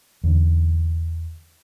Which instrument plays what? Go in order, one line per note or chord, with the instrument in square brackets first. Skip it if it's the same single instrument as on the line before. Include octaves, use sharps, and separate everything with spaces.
[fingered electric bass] E2 D3